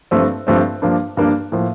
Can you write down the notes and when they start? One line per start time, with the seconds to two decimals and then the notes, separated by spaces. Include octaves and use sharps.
0.11 G2 F3 A3 C4
0.47 G2 F3 A3 C4
0.82 G2 F3 A#3 D4
1.17 G2 F3 A#3 D4
1.52 A2 F3 A#3